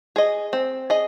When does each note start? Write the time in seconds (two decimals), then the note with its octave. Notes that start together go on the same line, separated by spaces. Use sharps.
0.16 G#4 D#5
0.53 C4
0.90 G#4 D#5